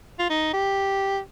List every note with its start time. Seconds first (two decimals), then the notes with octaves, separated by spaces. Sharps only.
0.19 F4
0.30 D#4
0.53 G4